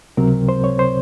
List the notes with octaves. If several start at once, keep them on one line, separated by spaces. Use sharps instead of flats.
C#2 C3 F#3 C4 A#4
C5
C#5
C5